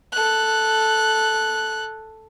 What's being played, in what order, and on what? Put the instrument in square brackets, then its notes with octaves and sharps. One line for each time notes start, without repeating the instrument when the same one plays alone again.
[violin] A4 F#6